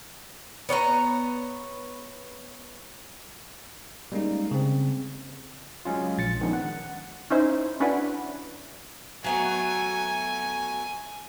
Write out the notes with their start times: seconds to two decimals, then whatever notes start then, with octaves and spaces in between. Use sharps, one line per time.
0.69 B3 C#5 F5 A#5
4.12 G3 G#3 A#3 C#4 D#4
4.51 C#3 C4
5.85 F#3 G#3 C#4 F4
6.18 A#1 A6 C#7
6.41 D#3 F3 G#3 B3 C#4 D4
6.53 F#5
7.30 C#4 D#4 E4 C5
7.80 C#4 D4 E4 F#4 B4
9.24 F#3 A3 B3 G#5